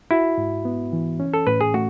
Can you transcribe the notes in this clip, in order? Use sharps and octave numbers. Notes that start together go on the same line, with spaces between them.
E4 F#4
G#2
B3
E3
C#4
A4
A2 B4
G#4
A3 F#4